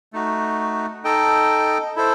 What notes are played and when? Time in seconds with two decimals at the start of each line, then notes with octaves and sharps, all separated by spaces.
0.13 A3 D#4 F#4
1.04 D#4 A4 D#5 G5
1.96 E4 A4 C5